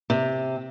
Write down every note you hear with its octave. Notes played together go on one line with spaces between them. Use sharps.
C3